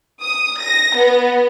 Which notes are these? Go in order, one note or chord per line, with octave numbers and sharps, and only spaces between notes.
D#6
A#6
B3